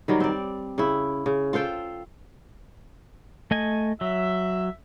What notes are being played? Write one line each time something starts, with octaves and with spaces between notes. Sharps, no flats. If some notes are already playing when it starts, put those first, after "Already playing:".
D#3 F#3 G3
C4 D5
C#3 E4
C#3
F4 A4 C5 G5
A3 D#5 G#5
F#3 E5